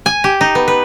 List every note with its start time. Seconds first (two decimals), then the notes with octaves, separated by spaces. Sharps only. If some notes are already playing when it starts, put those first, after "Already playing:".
0.06 G#5
0.24 G4
0.41 D#4
0.55 B3
0.68 B4